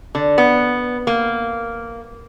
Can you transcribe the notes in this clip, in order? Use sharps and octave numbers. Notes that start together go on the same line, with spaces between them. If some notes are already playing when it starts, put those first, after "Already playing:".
D3
B3
A#3